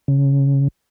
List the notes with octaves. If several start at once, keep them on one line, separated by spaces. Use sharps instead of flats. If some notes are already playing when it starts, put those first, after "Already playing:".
C#3